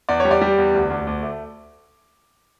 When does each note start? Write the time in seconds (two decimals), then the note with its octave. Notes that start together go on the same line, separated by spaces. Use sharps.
0.09 E2 D5
0.20 C#5
0.25 G3
0.31 D5
0.42 G3
0.58 E2
0.74 D2
0.90 D2
1.07 D2
1.22 A3